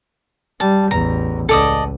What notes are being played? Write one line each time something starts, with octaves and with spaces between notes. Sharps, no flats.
G3 A5
A1 E2 A#5
C#2 A4 D5 D#5